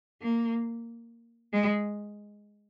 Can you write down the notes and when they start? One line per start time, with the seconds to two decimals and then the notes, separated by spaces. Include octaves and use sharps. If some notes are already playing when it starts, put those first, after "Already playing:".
0.21 A#3
1.53 G#3